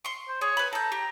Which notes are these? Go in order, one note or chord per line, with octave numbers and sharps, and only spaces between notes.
C6 C#6
C5
G#4 C#5
B4 B5
A4 A#5 G6
G4